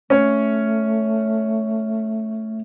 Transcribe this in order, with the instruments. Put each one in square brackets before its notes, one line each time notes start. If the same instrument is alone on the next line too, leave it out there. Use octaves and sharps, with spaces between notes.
[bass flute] A3 [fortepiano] C#4 C#5